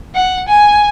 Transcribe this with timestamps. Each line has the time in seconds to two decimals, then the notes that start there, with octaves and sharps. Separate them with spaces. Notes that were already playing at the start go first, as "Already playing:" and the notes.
0.15 F#5
0.49 G#5